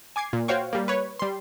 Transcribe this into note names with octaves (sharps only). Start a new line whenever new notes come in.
G#5 D6 G#6 C7
A#2
F#4 C5 C#5 F5 G5 C#6
G3 A#3
B4 C#5
G3 C6